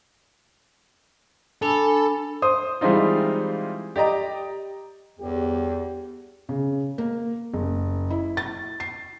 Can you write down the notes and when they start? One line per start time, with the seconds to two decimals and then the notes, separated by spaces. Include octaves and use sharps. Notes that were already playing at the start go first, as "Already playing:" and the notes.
1.62 D4 A4 G#5 B5
2.42 C5 D#6
2.81 E3 G3 G#3 C4 D#4 F4
3.96 G4 D5 D#5 A#5
5.19 G1 E2 G4
6.49 C#3
6.98 A#3
7.53 F#1
8.10 E4
8.37 A6
8.80 C7